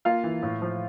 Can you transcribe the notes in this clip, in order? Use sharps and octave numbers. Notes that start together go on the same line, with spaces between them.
A#3 F4 F5
E3
A2
F3